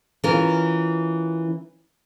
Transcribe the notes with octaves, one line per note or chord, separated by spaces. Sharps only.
E3 C#4 F4 A#4